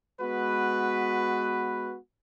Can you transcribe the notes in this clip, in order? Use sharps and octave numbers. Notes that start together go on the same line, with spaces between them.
G#3 B3 F#4 B4